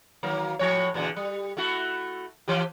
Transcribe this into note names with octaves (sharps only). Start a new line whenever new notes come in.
D#3 F#3 A#3
A2 F3 C#5
E2 A#2 D3
G3
A3 E4 F#4
E3 F3 G4